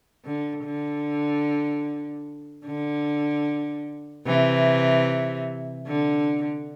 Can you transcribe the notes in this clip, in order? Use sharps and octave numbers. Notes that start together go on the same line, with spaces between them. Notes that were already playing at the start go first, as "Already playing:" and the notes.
D3
D3
D3
C3 E3
D3